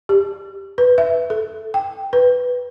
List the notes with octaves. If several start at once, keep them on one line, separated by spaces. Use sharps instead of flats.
G4
B4
E5
A4
G5
B4